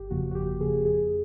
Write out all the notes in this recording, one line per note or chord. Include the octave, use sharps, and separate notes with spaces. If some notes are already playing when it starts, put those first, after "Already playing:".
Already playing: G1 G4
F2 C#3 F3 A#3 F#4
F#4
G1 G4
F2 C#3 F3 A#3 G#4
F2 G#4